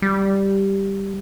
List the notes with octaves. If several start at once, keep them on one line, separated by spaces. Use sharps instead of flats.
G3